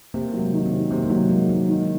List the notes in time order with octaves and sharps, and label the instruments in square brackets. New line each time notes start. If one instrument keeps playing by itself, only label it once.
[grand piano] C3 [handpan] A#3
[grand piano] F#3
[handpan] G#3
[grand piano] D#3
[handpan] C4
[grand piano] C3
[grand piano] C3 [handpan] A#3
[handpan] G#3
[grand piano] F#3 [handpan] A#3
[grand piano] D#3 [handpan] G#3
[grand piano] C3 [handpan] F#3
[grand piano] D#3